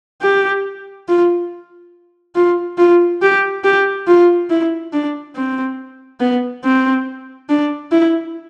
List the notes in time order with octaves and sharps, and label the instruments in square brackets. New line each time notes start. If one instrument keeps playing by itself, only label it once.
[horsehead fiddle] G4
F4
F4
F4
G4
G4
F4
E4
D4
C4
B3
C4
D4
E4